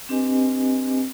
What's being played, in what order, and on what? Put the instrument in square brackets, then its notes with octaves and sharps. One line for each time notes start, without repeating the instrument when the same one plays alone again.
[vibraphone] C4 D4 G4 B4 D#5 G#5